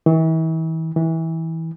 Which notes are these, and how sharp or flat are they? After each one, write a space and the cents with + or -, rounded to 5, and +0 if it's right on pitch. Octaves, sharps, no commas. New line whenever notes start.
E3 -40
E3 -25